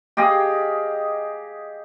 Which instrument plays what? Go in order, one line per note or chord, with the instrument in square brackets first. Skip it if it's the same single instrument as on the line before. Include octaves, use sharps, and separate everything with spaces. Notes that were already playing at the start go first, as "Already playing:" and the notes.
[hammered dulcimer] G4 G#4 D#5 F5